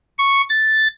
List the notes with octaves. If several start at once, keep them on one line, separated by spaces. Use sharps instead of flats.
C#6
A6